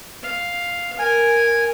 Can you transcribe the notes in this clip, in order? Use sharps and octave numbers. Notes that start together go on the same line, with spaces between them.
F5
A#4 G#5